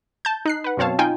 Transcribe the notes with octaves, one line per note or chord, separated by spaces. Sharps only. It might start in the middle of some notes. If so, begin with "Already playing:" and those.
A5 G6
D#4 F#6 C7
B4 F#5
F#2 B2 C4 C#5 F5 A5
D#4 F4 G5 G#5